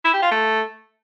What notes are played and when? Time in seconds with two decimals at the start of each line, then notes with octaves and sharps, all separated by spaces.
0.05 E4
0.14 G4
0.22 F4
0.31 A3